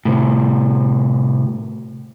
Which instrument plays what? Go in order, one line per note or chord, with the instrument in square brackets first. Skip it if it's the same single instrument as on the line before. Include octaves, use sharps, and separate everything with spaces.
[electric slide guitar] A2 C3